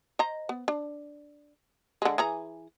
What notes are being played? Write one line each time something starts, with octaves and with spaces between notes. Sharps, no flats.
C5 D#5 A#5
B3
D4
D3 G#3
E3 G#4 A#5